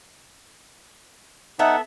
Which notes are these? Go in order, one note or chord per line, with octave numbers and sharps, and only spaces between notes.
B3 D#4 A4 E5 F#5